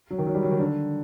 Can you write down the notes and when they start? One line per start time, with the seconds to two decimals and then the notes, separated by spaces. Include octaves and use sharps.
0.10 F#3
0.18 D#3
0.26 F#3
0.35 G3
0.43 F#3
0.51 D#3
0.59 D3